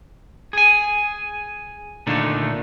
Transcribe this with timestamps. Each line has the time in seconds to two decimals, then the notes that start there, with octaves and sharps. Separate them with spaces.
0.53 G#4 G#5
2.07 A#2 D3 D#3 A3 D4 D#4